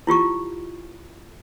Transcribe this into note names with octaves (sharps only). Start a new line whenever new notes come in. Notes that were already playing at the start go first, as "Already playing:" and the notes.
E4 F4 G4 C#6